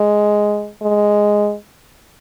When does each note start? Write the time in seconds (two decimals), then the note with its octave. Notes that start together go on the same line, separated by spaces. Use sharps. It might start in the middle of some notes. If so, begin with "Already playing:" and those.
Already playing: G#3
0.82 G#3